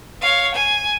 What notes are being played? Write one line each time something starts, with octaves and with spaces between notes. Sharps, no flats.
C#5 F5
G#5